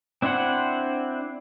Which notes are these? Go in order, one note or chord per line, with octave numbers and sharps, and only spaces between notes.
C4 D4 E4 C5 F#5